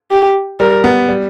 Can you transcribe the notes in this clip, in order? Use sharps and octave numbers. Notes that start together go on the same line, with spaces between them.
G4
G3 A#4
B3
G3